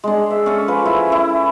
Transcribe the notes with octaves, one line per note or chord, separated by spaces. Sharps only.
G#3 D4
E5
C#4 A4
F3 B4
E4
E4